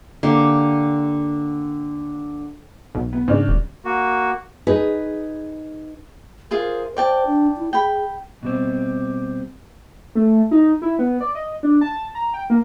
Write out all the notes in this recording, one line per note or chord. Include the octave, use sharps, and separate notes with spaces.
D3 A#3 G4 C6
B1
B3
G#2 C#3 D4
D#1
A#3 F#4
D#4 G#4 B4
F4 G#4 A#4 C5
C5 D5 G5 A5
D4
E4
G#4 G5 B5
B2 G3 C4
A3
D#4
E4
B3
D5
D#5
D4
A5
A#5
G5
A#3